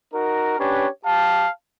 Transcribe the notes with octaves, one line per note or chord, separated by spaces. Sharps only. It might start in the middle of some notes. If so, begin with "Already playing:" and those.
D#4 F#4 A#4
C#4 D4 G4 B4 C#5
G4 F5 A5